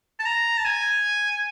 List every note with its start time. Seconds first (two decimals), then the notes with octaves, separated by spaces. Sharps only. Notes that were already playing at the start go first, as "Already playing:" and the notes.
0.19 A5
0.25 A#5
0.58 A5
0.65 G#5